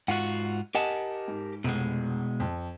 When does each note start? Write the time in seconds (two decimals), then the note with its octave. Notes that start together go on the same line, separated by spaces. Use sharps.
0.08 G#2 F4 F#4 F#5 D#7
0.75 G4 A#4 D#5 F#5 G#5 A5
1.28 G#2
1.64 F1 B2 G#3
2.40 F2 A5